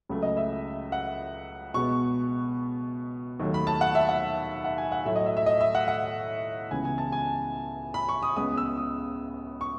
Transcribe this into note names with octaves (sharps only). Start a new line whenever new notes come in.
C#2 C#3 F#3 A3
D#5
E5
F#5
B2 G#3 B3 C#6
D#2 D#3 F#3 A3
B5
A5
F#5
E5
F#5
F#5
G#5
F#5
A2 F#3 A3 E5
D#5
E5
E5
D#5
E5
F#5
F#5
C#2 C#3 E3 B3 G#5
G#5
A5
G#5
B5
C#6
D#6
C#2 C#3 G#3 B3 D#6
E6
D#6
C#6